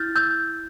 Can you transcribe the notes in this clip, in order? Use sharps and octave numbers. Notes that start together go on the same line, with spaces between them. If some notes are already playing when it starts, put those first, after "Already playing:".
Already playing: E4 F6 G6 A6
E6 G6